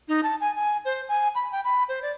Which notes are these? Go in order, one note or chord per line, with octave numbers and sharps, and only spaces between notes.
D#4
A5
G#5
G#5
C5
G#5
B5
G5
B5
C5
D5